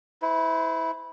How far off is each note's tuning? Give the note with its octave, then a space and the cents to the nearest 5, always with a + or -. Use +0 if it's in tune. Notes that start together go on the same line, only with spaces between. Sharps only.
E4 -15 C5 -45